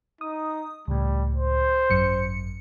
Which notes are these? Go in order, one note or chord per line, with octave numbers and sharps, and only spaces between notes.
D#4 D#6
C#2 A2 G3
C5
G#1 F#2 C#7